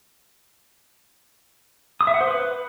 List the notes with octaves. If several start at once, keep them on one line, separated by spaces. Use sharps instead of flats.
D#6
E5
F#5
C5
B4